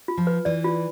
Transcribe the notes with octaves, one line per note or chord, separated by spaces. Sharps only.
F4
F3
B4
E3 D5
F4